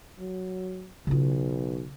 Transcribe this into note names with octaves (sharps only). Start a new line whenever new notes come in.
F#3
B1 C#3 F4